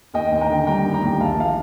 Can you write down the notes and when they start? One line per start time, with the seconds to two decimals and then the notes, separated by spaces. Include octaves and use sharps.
0.14 D#2 D#5 G5
0.32 D#2
0.41 G5 A#5
0.50 D3
0.67 G3 G5 A#5
0.86 D#2
0.94 G5 A#5
1.03 D#2
1.21 A#1 F5 A5
1.40 F5